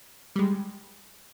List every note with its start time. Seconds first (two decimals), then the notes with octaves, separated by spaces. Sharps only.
0.36 G3 G#3